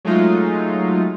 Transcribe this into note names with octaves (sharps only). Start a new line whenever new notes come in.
F#3 G#3 A3 D#4 F4